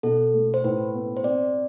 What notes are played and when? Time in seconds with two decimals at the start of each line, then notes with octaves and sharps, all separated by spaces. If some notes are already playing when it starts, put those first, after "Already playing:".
0.03 B2 A4
0.34 A3
0.54 C5
0.64 A2 B4
0.94 B3
1.17 C5
1.24 C4 D5